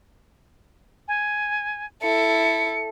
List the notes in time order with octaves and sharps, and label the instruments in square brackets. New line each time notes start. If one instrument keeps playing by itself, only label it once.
[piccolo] G#5
[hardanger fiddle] E4 A4 [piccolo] C#7